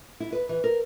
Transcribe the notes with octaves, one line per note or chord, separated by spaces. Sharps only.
E4
B4
E3
A#4